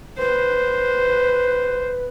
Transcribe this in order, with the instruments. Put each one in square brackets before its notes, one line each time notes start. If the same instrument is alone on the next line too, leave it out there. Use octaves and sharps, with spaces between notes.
[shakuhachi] B4 [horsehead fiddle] C5